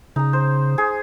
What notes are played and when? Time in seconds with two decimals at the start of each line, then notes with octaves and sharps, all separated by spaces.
0.16 C#3 D#4 A#5
0.33 C5
0.78 G#4